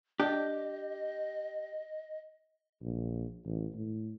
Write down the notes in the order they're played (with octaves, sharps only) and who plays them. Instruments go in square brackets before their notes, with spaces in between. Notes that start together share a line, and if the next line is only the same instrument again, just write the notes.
[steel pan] D4 [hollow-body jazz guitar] G4 [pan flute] D#5
[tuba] A#1
A1
A2